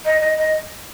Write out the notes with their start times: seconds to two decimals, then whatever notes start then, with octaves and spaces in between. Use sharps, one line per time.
0.05 D#5
0.21 D#5
0.38 D#5